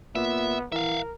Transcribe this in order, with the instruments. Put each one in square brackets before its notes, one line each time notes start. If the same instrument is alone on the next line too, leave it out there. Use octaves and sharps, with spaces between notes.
[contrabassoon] A#2 [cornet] B3 [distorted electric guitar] E5
[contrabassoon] E3 [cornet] A#4 [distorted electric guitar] E5 F5